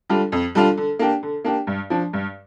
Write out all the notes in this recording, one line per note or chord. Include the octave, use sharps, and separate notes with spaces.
D3 G3 D4 F4
F2
D3 G3 D4 F4
D3
A#3 D4 G4
D3
A#3 D4 G4
G2
F3 D4
G2